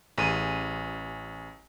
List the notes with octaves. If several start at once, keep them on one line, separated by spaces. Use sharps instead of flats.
A1 G#4 D#7